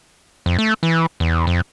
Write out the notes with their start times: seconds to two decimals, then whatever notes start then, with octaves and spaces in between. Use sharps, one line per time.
0.46 F2
0.59 A3
0.83 E3
1.20 E2
1.47 F2